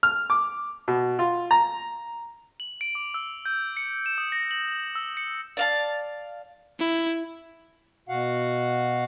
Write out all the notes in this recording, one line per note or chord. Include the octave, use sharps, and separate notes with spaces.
F6
D6
B2
F4
A#5
F#7
D7
D6
E6
G6
C#7
E7
D#6
A#6
F#7
E6
C#7
D5 F5 A5
E4
B2 F#4 F5 F#5